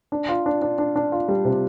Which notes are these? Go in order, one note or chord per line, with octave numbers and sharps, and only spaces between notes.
D4
F4
D4
D4
D4
D4
F4
G3
C3